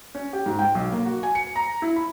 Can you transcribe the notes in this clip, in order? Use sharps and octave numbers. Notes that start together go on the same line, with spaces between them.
C#4
G4
G#2
G5
B1
A#3
F#4
G#5
C#7
A#5
E4
B5